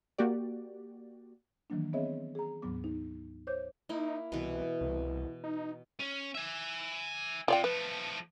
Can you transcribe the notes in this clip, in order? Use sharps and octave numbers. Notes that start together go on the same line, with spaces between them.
A#3 F#4 G4 D5
D#3 E3 F#3 A#3 D4
B3 C4 G#4 C#5 D#5 E5
G#4 A#5
D2 G#2 F#3 B3 D6
D#4
C5 C#5 D6 G6
A#3 D#4 E4
C2 B2 E3
C2
D#4
C#4
E5 G#5
C3 F4 D5 G5
F3 A3 B4